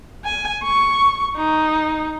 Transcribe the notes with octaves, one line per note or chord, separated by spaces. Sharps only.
G#5
C#6
D#4